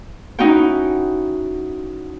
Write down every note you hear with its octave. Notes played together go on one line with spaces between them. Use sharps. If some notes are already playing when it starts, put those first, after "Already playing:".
C#4 D#4 E4 F#4 F#5 G5